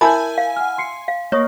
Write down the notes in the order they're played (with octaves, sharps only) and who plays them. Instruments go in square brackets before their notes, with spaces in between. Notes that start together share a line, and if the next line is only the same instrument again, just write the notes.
[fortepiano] E4 A5 B5 [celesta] A#4 G6 [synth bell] G#5
[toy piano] F5
[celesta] F#5 F6
C6 C7 C#7
[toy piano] F5
[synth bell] A#3 [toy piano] C#5 [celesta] D#5 C#6 D#6